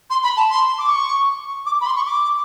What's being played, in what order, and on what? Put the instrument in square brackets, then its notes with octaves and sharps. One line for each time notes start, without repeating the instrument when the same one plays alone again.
[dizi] C6
B5
A5
C6
D6
C#6
D6
B5
C6
C#6
D6